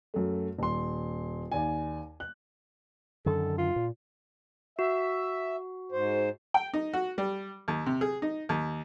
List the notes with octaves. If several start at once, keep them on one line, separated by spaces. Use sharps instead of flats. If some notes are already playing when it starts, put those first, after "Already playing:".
F#2 A3
D#1 C6
D#2 D5 G#5
F#6
F#2 D3 D#3 A4
F4
A#2
F#4 E5
G#2 C5
G5
D#4
F#4
G3
D#2
C3
G#4
D#4
D#2